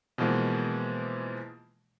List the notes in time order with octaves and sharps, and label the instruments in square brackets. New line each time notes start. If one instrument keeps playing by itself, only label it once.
[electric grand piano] B2 E3 F3 G#3 A#3